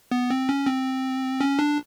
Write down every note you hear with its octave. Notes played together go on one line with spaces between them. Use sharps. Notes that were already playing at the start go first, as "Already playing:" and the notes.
B3
C4
C#4
C4
C#4
D4